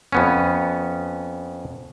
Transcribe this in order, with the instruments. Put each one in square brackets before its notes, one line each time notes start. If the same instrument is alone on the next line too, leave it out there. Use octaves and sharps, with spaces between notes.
[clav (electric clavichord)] F2 B3 C#4